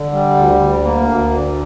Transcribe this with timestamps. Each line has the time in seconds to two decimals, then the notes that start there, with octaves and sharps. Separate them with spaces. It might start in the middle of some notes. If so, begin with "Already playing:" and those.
Already playing: D3
0.12 G3
0.35 D2
0.61 D2
0.84 A#3
1.08 D2
1.33 D3